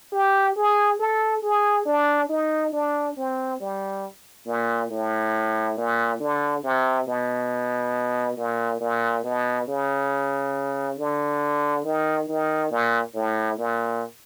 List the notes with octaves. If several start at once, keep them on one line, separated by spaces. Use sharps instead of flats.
G4
G#4
A4
G#4
D4
D#4
D4
C4
G3
A#2
A2
A#2
D3
C3
B2
A#2
A#2
B2
C#3
D3
D#3
D#3
A#2
A2
A#2